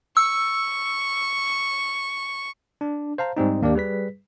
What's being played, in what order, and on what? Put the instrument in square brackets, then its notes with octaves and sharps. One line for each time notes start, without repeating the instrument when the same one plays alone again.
[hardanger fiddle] C#6 [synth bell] E6
[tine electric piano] D4
C5 F5 A5 A#5
G#2 G3 C4 D#4
D#2 A#3 D4 G4 D5
G3 G#4 B4 B6